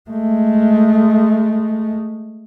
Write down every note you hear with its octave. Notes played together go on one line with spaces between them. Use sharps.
G#3 A3